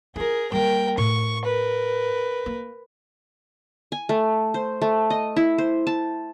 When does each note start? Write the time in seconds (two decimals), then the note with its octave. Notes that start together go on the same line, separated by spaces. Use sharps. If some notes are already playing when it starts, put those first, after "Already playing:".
0.16 E4 F4 G#4 A#4
0.52 G3 A#3 A#4 G5
0.98 A2 C#6
1.45 A#4 B4
2.46 A#3
3.92 G#5
4.09 A3
4.54 C5
4.82 A3
5.10 D#5
5.36 E4
5.58 C5
5.87 A5